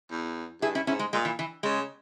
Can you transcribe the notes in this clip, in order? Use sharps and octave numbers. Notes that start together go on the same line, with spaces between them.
E2
G2 E4 G#4
C#4 E4
G#2 C#4 E4
G#3
A#2 G#3
E3
E3
C#3 G#3